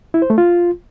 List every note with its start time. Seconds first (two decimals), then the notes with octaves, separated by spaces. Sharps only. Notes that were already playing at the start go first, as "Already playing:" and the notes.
0.14 E4
0.22 C5
0.30 A3
0.38 F4